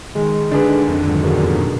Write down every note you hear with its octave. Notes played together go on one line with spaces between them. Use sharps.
D#3 G#3
D3 D4 G#4 B4
F2 D3
G#2
F#2
B2 G#3 D4 F#4 A#4
A#2
B2